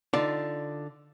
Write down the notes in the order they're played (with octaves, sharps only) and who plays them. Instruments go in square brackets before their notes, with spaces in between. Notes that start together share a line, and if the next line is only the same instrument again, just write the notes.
[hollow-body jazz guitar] D3 D#4 F4 D5